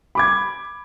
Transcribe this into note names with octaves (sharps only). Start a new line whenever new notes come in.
B5 D6 G#6